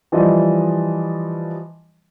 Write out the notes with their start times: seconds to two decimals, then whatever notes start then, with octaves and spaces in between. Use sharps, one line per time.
0.12 E3 F3 G3 D#5